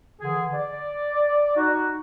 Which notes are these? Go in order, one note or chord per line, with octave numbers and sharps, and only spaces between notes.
D3 E3 G#4
D5
D#4 F#4